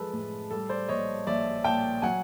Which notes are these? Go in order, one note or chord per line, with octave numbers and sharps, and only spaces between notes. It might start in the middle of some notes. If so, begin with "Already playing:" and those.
Already playing: F3 G#3 A4 B4
A2
G3 A4
C5 D5
A#1 C#5 D#5
A#1 D5 E5
A#2 G5 A5
F#3 F#5 G#5